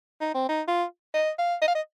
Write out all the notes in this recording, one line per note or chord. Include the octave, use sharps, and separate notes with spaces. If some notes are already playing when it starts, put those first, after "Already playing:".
D#4
C4
D#4
F4
D#5
F5
D#5
F5
D#5